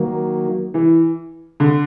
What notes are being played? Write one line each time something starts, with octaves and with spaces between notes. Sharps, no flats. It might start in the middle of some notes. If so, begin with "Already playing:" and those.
Already playing: D#3 F#3 A#3
E3
D3